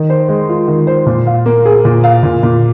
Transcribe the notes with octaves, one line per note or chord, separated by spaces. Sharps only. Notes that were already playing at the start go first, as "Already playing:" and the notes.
Already playing: D#3
C5
G#3
F4
D#3
C5
A#2
F5
A#3
G#4
A#2
F5
A#2
A#2